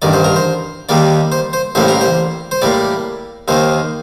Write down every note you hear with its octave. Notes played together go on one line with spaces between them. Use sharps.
A1 G2 D#3 D5
C5
A#4
C5
D#2 D#3 G3 A#3 D5
C5
C5
A1 A2 G3 A#3 C5
A#4
C5
C5
A2 G3 A#3 D5
D#2 D#3 A#3 C5